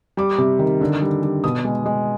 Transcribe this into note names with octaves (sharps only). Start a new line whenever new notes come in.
G3 D6
C3
D#3
D3
G3
G3
B2 D#6
G#3
G#3